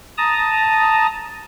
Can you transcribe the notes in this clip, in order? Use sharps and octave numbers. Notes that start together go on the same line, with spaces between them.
A5 A#5 D#6